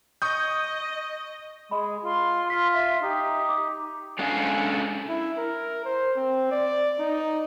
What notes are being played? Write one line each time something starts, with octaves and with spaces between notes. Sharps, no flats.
D#5 C#6 D#6 G6
G#3 G#4 D#5 B5
F4 C6
F4 C6 B6
E5
D#4 G4
D6
G#3 C#4 D4 G#4 A4 F5
E4
A#4
C5
C4
D5
D#4